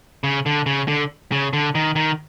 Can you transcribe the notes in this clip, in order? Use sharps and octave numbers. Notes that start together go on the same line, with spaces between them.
C#3
D3
C#3
D3
C#3
D3
D#3
D#3